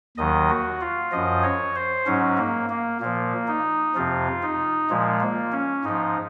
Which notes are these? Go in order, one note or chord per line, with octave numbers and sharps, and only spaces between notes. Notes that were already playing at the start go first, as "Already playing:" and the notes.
D#2 D#3 F#3 D#5
F#4
F4
F#2 F3 D#5
C#5
C5
G#2 F#3 C#4
A#3
A#3
A#2 F3 A#3
D#4
F2 C3 F3 F4
D#4
A#2 F3 G#3
A#3
C#4
G#2 F3 D#4